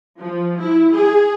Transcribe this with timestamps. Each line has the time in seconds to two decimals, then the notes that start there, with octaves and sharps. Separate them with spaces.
0.19 F3
0.57 E4
0.93 G#4